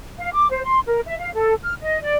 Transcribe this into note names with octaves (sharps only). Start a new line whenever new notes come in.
F5
D6
C5
C6
A#4
E5
F5
A4
F6
D#5
D5